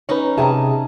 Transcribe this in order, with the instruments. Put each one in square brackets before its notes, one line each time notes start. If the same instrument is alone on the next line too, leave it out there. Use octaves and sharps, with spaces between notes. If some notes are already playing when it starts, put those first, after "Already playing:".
[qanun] C#4 D#4 [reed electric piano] B4 C#5
[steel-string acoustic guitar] C3 G#4 A5 [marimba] E5 G5 A#5